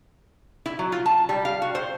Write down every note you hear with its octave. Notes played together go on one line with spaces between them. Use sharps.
E4
F#3
F4
A5
G3
F5
F#4
C5